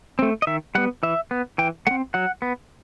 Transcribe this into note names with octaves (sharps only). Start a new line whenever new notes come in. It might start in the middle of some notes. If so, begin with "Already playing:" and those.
A3 C4
D#5
D#3 E5
G3 B3 F#5
E3 E5
B3
E3 G5
A3 F#5
C4
F#3 F#5
B3